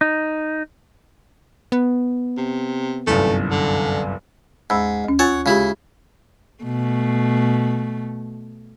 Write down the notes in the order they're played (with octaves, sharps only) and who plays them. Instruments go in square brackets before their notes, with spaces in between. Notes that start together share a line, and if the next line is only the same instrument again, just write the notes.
[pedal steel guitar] D#4
[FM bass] B3
[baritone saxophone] C3
[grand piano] G1 C2 F#2 [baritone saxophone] A3
[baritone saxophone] D3
[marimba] D#2 B5 E6 [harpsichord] G#2
[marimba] D2 C#4
[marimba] F4 G#5 A6 [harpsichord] C#5 F#5
[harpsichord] C#3 E4 [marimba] G#3 F4 G4
[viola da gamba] B2 A3